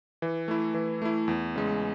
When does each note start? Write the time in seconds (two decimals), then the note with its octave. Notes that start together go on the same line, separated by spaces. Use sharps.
0.22 E3
0.48 A3 E4
0.74 E3
1.02 A3 E4
1.28 E2
1.55 C#3 G#3